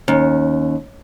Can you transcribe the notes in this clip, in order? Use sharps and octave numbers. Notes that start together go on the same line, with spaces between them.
D#2 C#4